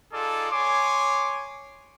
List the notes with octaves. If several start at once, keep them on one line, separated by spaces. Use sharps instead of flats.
D#4 F4 G#4 A4 D5
C#5 G#5 C6 D6